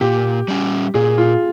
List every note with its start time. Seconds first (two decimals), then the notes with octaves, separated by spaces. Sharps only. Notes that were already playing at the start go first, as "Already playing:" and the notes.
0.01 A#2 G4
0.48 G3 C#4
0.94 A#2 G#4
1.18 F4